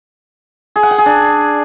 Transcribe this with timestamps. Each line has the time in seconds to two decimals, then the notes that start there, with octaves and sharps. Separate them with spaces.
0.76 G#4
0.83 F#5
0.91 G5
0.98 G#4
1.06 D4